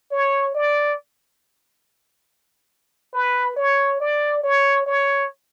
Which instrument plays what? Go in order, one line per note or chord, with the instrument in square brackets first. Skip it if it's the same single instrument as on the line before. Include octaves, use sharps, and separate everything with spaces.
[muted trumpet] C#5
D5
B4
C#5
D5
C#5
C#5